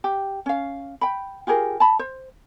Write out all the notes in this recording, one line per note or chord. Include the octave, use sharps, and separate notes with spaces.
G4
C#4 F5
G5 B5
F4 G4 G#4 A#4
A5 B5
C5